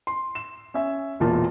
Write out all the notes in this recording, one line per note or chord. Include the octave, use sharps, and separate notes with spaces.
C6
E7
C#4 E5
E1 E2 A#2 F4 A#4 A5